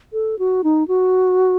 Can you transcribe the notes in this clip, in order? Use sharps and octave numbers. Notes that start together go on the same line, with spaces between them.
A4
F#4
D#4
F#4